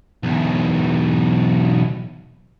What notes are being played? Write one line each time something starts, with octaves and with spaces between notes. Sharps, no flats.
B1 E2